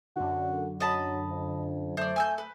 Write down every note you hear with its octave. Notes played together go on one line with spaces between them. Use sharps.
F#2 D3 F#4
F#3 D#5 A5 B5
F2
A3 C5 D5
G#5 E6 G6
B4